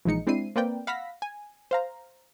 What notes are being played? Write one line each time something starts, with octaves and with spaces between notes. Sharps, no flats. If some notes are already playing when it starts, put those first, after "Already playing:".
A#1 E3 G#3 D#4 C#7
G#3 C4 D4 E4 C7 D#7
A#3 C4 A#4 B4 D5 G5
F5 F#5 B5 E6 A#6 B6
G#5
C5 F5 A#5